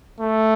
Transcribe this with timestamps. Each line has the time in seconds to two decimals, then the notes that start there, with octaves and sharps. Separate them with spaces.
0.20 A3